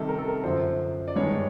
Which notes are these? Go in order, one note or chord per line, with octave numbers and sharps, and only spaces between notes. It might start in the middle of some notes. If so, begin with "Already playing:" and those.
Already playing: C3 D#3 G3 A4
A#4
A4
A#4
F#2 D3 F3 C5
D5
G2 D#3 G#3 C#5